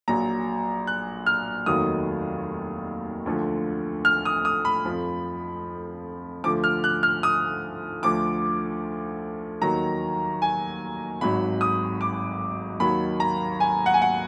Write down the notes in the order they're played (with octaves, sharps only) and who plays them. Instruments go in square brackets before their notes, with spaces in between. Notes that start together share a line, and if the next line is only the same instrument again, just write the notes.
[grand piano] A#1 A#2 F#3 A#5
F#6
F6
F1 D#2 D#3 F#3 D#6
D2 D3 F3
F6
D#6
D#6
B5
F2 F3
D2 D3 F3 D6
F6
F#6
F6
D#6
D2 D3 F3 D6
D#2 D#3 F#3 A#5
G#5
G#1 G#2 F#3 B5
D#6
D6
D#2 D#3 F#3 B5
A#5
G#5
F#5
G#5
F#5